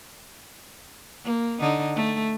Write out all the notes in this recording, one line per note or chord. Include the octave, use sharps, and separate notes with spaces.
A#3
D3 D#4
A3